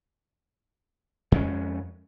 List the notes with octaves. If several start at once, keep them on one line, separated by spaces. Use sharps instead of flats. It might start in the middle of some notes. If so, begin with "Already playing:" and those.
F2 G#3 C#4